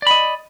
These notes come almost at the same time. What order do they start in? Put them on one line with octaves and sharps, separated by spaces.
D5 B5 D#5